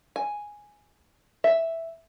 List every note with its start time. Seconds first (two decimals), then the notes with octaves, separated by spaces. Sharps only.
0.16 G#5
1.44 E5